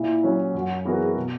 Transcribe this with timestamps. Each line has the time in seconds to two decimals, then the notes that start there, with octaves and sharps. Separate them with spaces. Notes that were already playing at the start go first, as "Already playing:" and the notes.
Already playing: A#2 E4
0.23 F#3 C#4
0.54 F#2 F#4
0.85 E3 B3 F#4 G#4 A#4
1.16 B2